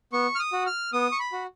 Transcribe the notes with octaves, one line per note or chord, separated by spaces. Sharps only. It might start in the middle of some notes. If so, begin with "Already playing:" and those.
B3 C#6
F6
D#6
F#4
F6
B3 D#6
C#6
B5
F#4